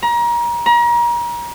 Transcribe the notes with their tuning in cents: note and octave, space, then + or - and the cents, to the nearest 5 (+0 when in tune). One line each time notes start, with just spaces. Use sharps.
A#5 +30
A#5 +35